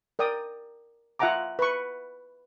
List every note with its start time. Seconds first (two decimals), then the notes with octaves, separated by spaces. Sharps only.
0.19 A#4 D5 G5 D#6
1.19 F4 E5 F#5 G#5 A#5 D6
1.59 B4 C#6